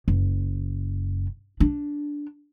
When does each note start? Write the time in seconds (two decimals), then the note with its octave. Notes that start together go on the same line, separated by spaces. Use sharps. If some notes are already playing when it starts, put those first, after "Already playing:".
0.08 F#1
1.60 D4